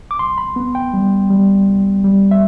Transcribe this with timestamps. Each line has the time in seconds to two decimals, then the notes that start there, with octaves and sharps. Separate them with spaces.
0.11 D6
0.19 C2 C6
0.38 B5
0.56 B3
0.75 G5
0.93 G3
1.30 G3
1.67 C2
2.04 G3
2.31 E5